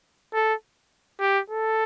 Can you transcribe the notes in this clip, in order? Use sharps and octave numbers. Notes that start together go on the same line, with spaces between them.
A4
G4
A4